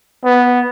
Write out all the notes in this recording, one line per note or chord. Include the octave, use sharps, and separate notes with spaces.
B3